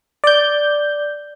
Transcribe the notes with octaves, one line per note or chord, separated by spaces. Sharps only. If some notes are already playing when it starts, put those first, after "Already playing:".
D5 G6